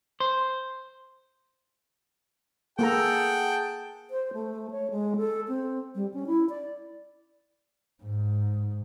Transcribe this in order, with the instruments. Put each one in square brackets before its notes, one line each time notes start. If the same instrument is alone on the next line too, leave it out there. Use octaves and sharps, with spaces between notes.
[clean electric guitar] C5
[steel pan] A#3 A4 A#5 [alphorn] G#4 [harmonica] F#5 G5 A5
[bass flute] C5
A3
C#5
G#3
A4
C4
G3
C#4
E4
D5
[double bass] G#2